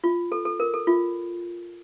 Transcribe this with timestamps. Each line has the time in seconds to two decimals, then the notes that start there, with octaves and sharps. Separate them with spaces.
0.04 F4
0.32 A4
0.45 A4
0.60 A#4
0.74 A4
0.87 F4